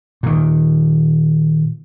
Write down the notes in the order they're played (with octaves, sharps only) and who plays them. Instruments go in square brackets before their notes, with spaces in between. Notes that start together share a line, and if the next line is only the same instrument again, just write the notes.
[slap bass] A#2 D#3